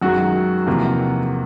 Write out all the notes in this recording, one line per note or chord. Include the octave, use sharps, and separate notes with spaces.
F#2 D#3 G#3 F#4
E2 C3 F3 A#3